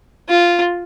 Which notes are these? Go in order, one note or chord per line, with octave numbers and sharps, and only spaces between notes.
F4